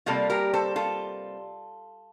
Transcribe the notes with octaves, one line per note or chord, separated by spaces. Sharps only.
C3 G3 A#3 F4 A4
G4 A#4
A4 C5
F4 A4